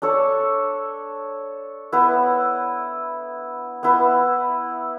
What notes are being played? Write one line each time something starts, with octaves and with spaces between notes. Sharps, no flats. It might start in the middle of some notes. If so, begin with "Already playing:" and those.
D4 A4 C#5
B3 E4 B4
B3 E4 B4